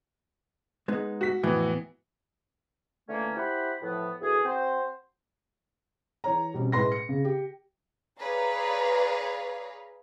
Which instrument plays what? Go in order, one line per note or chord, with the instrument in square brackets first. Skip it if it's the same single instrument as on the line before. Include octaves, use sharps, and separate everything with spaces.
[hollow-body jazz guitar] G#3 B3 D#4
[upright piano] F#4 B6
[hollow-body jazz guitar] F2 A2 [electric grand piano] E3 B3
[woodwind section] D3 E3 A3 A#3 C#4
E4 G4 C5 F#5 B5
A2 E3 F3 B3
D2 E3 G#4
C4 F#4 C5
[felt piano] E3 C#5 A#5
B2 G3 C4 C#4
A2 G#3 B4 C6 A#6
C#7
C#3
G4
[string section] G#4 B4 C#5 D5 F5 A#5